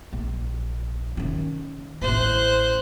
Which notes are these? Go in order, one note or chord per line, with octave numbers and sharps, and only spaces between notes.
A#1
D#3 C#4
A1 E4 C5 F#6